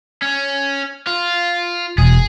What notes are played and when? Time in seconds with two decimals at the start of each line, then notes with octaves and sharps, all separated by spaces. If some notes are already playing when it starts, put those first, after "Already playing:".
0.22 C#4
1.07 F4
1.98 E1 G#4